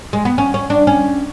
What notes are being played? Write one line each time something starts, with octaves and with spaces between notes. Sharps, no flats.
G#3
B3
C#4
C#4
D4
C#4